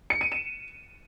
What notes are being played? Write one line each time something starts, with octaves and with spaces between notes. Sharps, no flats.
C#7
D#7
E7